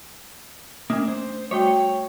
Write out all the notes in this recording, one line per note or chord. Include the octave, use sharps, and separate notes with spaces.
A3 A#3 C#4 D4
C5
G3 A3 F#4 C#5 G5